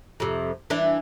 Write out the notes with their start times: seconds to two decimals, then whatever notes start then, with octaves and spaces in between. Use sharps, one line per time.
0.20 F2 C3
0.70 E3 D4